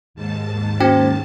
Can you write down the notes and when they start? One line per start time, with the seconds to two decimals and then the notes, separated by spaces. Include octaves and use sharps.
0.14 D#2 G#2 A5
0.80 A#3 C#4 F#4 C5 G5